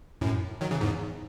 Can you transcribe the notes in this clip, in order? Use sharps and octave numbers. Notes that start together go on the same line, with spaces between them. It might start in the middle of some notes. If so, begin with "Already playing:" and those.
F#2 A2
D#3 F#3
C#3 E3
E2 G#2